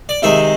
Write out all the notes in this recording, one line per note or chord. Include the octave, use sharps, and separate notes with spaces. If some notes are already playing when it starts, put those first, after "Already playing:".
D5
C3 D#3 G#3 E5